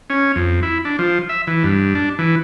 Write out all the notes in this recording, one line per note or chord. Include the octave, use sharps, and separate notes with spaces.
C#4
F2
E4
D4
F3
E5
E3
G2
D4
E3